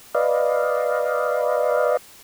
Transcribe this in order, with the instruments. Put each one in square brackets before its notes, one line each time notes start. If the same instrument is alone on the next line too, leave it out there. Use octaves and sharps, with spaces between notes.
[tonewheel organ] B4 D5 D#5 F5